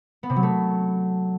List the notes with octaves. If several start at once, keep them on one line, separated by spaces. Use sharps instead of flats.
B3
C3
F#3
A3